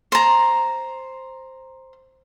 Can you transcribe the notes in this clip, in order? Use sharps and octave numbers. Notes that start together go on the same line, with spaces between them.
C5 A#5